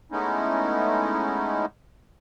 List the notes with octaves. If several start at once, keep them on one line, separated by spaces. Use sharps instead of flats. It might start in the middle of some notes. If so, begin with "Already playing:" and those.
G#3 A3 B3 C#4 D#4 E4